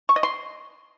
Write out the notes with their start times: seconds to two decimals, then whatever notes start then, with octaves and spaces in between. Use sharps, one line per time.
0.09 C#6
0.16 D#5
0.23 C6